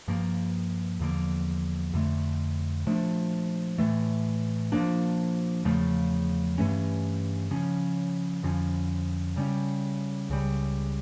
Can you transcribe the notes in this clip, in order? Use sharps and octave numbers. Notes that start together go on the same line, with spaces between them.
G2 F3 A#3
E2 D3 F3 A#3
F2 D3 A3
A#2 F3 A3 D4
A2 E3 A3
A#2 F3 A#3 D4
E2 C#3 F3 A3
G2 E3 A3 C#4
C#3 F3 C#4
F2 D3 F3 C#4
C#3 G3 C#4
C#2 C#3 G3